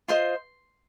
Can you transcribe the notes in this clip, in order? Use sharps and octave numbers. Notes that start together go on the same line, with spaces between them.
F4 C5 D#5 C6